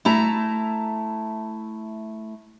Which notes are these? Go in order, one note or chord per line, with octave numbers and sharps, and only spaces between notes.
A3 E4 A5 A#5